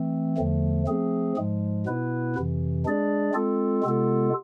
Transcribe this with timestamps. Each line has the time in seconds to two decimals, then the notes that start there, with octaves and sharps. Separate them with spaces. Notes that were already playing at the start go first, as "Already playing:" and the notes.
Already playing: E3 A3 C4
0.37 E2 D3 F3 A3
0.87 F3 A3 C4 G#4
1.37 G#2 F3 G#3
1.86 B2 B3 E4 B4
2.36 F2 C3 E3
2.85 G#3 D4 G#4 D5
3.34 G#3 C4 F4 A4
3.84 C3 G#3 B3 F4 A4